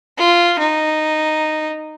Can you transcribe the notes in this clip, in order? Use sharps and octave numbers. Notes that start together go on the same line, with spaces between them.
F4
D#4